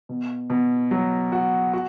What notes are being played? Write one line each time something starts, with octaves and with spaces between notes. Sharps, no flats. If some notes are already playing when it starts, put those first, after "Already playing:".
B2
B2
F#3
F#4
F#4